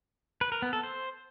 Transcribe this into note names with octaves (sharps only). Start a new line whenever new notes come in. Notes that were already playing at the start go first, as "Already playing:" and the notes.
B4
A#4
B3
A4
C5